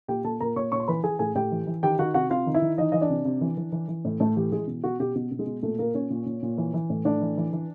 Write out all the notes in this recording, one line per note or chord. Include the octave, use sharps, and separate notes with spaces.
A#2 G4 G5
A#2 A4 A5
A#2 A#4 A#5
A#2 C#5 C#6
A#2 C#5 C#6
C6
E3 B4 B5
E3 G#4 G#5
A2 G#4 G#5
A2 G4 G5
E3
E3
D#3 G4 G5
D#3 F#4 F#5
C3 F#4 F#5
C3 F4 F5
D#3
E4 E5
D#3
E3 D#4 D#5
E3 D#5
D4 D5
C3
C3
E3
E3
E3
E3
A2
A2 A3 A4
E3 G4
E3 G#3 G#4
B2
B2 F#4
B2 G4
B2
B2
G#3 G#4
B2
A#2 A3 A4
A#2 A#3 A#4
A#2 C#4 C#5
A#2
A#2
A#2
E3
E3
A2
A2 D4 D5
E3
E3
E3